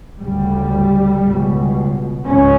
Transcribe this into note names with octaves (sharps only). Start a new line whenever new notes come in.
D2 C#3 G3
C#2 B2
C#2 C#4